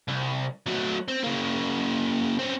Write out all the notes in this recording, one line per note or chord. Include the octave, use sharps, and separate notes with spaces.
C2
F#3 A3
C4
C#3 A#3
C4 C#4